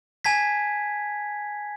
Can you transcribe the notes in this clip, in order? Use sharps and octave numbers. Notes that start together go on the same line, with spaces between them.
G#5 A5 G#6 B6